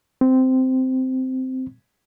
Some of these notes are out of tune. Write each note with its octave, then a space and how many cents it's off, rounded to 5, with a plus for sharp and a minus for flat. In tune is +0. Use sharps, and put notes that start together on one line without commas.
C4 -10